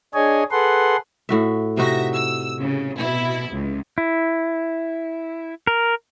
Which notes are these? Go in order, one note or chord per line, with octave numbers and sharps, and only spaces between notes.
D4 G#4 C#5 D#5 G#5
G#4 A4 B4 F#5 C6
A2 F#4 E5
C3 D#4 F#4 E5 A#6
E6
C#3
B2 E4
C#2
E4
A#4